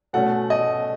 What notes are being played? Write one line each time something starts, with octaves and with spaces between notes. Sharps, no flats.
B2 A3 C#4 F#5
D#5